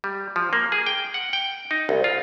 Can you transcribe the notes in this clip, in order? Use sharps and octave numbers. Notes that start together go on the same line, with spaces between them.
G3
F3
A#3
G#4
G5
F#5
G5
D#4
C2
F4